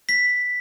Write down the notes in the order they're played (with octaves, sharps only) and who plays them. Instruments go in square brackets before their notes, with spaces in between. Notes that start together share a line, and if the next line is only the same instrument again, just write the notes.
[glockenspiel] B6